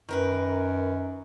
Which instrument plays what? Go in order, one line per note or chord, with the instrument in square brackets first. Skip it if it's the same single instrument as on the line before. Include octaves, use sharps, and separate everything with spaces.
[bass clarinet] F#2 [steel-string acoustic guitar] D#3 A#4 B4